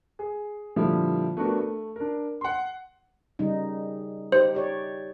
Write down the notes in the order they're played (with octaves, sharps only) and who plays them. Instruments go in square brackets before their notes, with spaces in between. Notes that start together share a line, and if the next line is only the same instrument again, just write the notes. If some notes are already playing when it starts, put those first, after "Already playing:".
[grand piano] G#4
A#2 D3 F3 G3 E4
A3 B3 D4 F#4 A#4
A3
D4 A#4
F#5 C6
[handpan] C#3 G3 D#4
[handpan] D#4 G4 [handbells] C5
[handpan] G4 C#5 D5